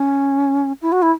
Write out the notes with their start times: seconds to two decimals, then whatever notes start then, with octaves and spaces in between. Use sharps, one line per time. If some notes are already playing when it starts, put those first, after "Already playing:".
Already playing: C#4
0.82 E4
0.92 F#4
1.02 E4